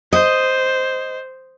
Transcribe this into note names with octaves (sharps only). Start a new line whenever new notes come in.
C5 D#5